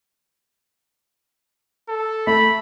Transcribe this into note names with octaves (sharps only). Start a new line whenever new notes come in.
A4
A3 B5